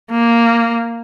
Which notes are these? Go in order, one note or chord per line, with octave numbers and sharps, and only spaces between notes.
A#3